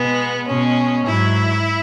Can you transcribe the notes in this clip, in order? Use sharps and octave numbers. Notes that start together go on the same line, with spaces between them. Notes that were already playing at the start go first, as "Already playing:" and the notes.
Already playing: B2 G#3 B3
B2 G#3 C#4
G#2 F#3 E4